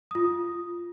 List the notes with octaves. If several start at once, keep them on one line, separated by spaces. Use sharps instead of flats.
F4 D#6